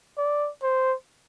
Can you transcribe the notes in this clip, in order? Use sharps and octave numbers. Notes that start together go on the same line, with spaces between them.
D5
C5